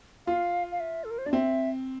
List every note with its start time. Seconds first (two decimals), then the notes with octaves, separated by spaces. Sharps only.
0.27 F4 F5
0.72 F5
0.80 E5
1.04 A4
1.11 A#4
1.18 C5
1.26 D4 D5
1.33 C4 E5